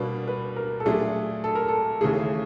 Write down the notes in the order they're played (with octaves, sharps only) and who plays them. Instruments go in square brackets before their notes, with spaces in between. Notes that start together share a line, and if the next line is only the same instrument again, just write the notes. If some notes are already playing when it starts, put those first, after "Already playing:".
Already playing: [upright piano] B2 G3 A#3 D4 [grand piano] B4
[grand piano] B4
A#4
A4
[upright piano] A#2 F#3 A3 D4 [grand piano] G#4
[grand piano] A4
A#4
A4
[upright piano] D#2 C#3 E3 A3 [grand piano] G#4